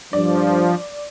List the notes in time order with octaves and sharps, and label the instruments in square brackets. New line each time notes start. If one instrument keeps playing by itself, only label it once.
[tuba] G2 [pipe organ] F3 [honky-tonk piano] D5